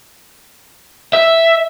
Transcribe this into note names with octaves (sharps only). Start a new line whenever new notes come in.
E5